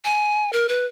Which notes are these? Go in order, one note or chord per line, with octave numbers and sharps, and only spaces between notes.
G#5
A#4
B4